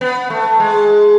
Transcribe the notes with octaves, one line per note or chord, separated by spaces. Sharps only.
B3
A3
G#3